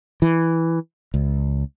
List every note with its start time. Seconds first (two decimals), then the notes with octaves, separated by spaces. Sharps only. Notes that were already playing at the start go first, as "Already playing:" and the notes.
0.22 E3
1.14 C#2